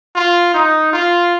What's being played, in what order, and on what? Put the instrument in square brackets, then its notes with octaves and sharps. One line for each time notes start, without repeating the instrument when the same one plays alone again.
[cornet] F4
D#4
F4